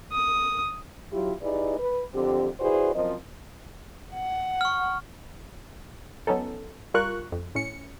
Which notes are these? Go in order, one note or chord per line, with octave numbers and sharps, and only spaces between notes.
D#6
F#3 E4 F4 G4
D#4 E4 G4 G#4 B4 D5
B4
F2 D3 C4 G4
E4 F#4 G#4 B4 C5 D5
F#2 F3 C4 A#4 D#5
F#5
C#6 F6
F#3 B3 C#4 D#4 A4
G3 F4 A#4 C#6 F#6
F2
A2 C#4 C#7